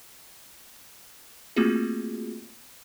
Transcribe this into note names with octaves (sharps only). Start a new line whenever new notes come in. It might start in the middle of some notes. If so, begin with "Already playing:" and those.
A3 A#3 C4 F4 F#4 G#4